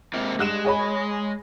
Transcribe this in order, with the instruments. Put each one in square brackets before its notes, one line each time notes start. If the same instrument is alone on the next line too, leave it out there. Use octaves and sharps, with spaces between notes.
[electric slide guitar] G#2 C3 A#3
[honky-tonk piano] G2 F#6 E7 [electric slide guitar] G#3
[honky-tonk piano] G#4 C#5 B5